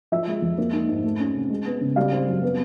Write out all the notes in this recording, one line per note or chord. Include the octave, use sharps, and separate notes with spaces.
F3 E5
G#3
F2
A#3
D#4
G#2
A3
C#4
C3
G#3
B3
C#3
G3 F5
C4
F#2
B3